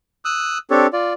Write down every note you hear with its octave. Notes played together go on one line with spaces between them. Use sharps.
D#6 E6 F#6
C4 D4 G4 A4 C#5
F4 D5